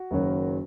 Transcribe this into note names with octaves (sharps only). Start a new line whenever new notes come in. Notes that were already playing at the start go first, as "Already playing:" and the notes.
Already playing: F#4
F#1 F#2 D#3 F#3